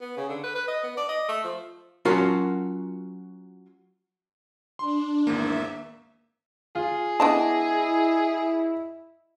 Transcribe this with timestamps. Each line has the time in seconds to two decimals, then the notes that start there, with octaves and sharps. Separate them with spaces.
0.01 B3
0.17 C#3
0.29 D3
0.43 B4
0.55 B4
0.68 D#5
0.83 B3
0.97 D5
1.09 D#5
1.29 A3
1.44 F3
2.05 F#3 C#4 F4 F#4 A#4 A5
4.79 D4 C6
5.27 G#1 E2 A#3 E5
6.75 F4 G#4
7.20 B3 D4 E4 D#5 A5